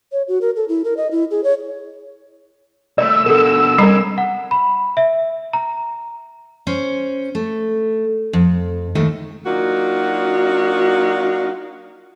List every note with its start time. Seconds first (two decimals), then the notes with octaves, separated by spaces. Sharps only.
0.12 C#5
0.28 F#4
0.41 A#4
0.56 A4
0.68 E4
0.84 A#4
0.97 D#5
1.11 E4
1.31 G#4
1.44 C#5
2.98 C2 A3 D5 E6
3.26 B2 D3 A4 A#4
3.78 C3 G3 C#4 A#4 A#5 B5
4.18 F#5
4.51 B5
4.97 E5
5.53 A#5
6.67 C#4 C5
7.35 A3
8.33 F2
8.95 D#2 D#3 A3
9.46 F#3 A#3 D4 D#4 F4 F#4